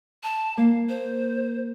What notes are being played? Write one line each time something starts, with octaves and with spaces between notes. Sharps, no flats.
A5
A#3 F5
C5